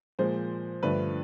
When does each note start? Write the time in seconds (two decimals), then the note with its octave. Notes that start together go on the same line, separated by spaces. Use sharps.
0.19 A#2 F3 G#3 C5
0.83 G2 D3 F3 A3 B4